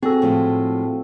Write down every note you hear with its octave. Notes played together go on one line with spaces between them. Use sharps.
C4 F#4 G#4 A4
A2 F3 G#3